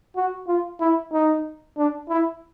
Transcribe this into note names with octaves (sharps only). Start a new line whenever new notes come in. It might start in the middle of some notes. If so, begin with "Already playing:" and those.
F#4
F4
E4
D#4
D4
E4